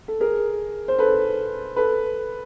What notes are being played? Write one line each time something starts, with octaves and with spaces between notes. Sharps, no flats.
A4
G#4 A#4
C5
A4 B4
A4 B4